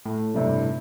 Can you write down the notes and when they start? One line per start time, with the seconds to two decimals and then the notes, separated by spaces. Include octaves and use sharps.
0.05 A2
0.34 G2 C3 G3